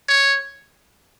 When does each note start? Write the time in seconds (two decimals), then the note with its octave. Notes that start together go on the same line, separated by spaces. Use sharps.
0.09 C#5